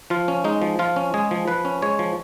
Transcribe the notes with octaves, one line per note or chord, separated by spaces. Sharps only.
F3 F4
C#4
G#3 D#4
F3
F3 F4
C#4
G#3 G#4
F3
F3 B4
C#4
G#3 C#5
F3